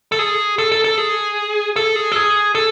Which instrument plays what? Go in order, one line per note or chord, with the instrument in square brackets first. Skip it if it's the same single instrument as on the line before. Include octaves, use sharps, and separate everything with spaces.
[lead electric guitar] A4
G#4
A4
A4
A4
G#4
A4
G#4
A4
G#4
A4